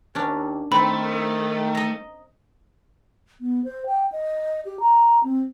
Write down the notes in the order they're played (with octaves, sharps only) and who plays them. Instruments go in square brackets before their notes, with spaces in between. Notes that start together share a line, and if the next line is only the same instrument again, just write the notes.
[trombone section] D#2 [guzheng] C#4 D4
[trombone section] D#3 [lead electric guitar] A3 [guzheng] C4 [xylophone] B5
[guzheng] D#5 A#5
[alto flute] B3
C5
G5
D#5
G4
A#5
C4